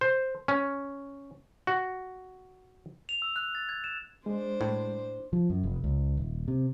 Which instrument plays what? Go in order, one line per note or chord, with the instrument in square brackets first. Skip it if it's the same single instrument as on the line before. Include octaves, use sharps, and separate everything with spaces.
[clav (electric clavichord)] C5
C#4
F#4
[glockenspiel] F7
E6
F#6
A6
G#6
E7
[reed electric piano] G#3 [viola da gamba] D4 C5
[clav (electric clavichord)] A2
[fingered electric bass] F3
F#2
F1
C#2
D#1
C3